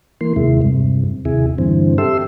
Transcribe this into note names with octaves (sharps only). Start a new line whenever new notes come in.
E3 A#3 C6
D#2 C3 G#3 E4
G2 C3
D#2 C3 E4 G#4
G2 D3 E3 C4
G4 A4 E5 C6 E6